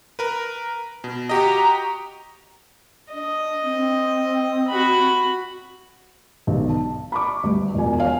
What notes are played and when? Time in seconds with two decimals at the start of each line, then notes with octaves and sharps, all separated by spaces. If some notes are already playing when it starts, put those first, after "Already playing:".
0.19 A#4 B4
1.04 B2
1.29 F#4 G4 D#5 A#5
3.13 D4 D#5
3.63 C4
4.68 F#4 B5
6.47 B1 D3
6.69 A5
7.12 B5 C#6 D6
7.43 D2 G2
7.75 E1 F3 G#5
7.98 C#5 F5 G#5